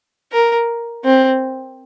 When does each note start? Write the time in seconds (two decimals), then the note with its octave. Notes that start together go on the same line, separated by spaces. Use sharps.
0.32 A#4
1.05 C4